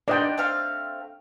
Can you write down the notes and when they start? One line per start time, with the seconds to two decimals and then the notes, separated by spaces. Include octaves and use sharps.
0.08 A#3 B3 D4 D5 D#5 G5
0.38 A3 C4 F5